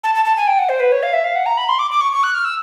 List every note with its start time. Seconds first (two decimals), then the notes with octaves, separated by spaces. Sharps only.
0.04 A5
0.15 A5
0.25 A5
0.37 G#5
0.47 G5
0.59 F#5
0.69 C5
0.80 B4
0.92 C#5
1.03 F5
1.13 E5
1.24 F5
1.35 F#5
1.46 A#5
1.57 B5
1.69 C6
1.79 D6
1.91 D6
2.01 C#6
2.13 C#6
2.23 F#6
2.34 F6
2.45 E6